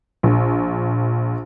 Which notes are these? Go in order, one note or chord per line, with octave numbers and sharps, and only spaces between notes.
A#1